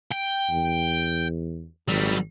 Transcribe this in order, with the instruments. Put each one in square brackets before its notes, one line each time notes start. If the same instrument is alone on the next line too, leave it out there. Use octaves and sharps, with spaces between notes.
[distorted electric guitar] G5
[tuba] E2
[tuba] G#1 [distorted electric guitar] F#3 G3